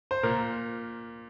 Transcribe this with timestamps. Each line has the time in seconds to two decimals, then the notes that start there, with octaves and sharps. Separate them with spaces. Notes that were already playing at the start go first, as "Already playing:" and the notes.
0.11 C5
0.23 A#2 A#4